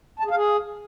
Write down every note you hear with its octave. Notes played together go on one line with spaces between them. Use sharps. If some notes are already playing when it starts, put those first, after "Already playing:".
A5
G#4
F5
G#4